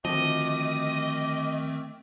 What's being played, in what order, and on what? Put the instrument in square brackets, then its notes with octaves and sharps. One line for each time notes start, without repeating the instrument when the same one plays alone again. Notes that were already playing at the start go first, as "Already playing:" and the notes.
[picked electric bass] D2 F3 [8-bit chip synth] D#3 A3 C4 [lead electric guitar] D#5 [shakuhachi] D6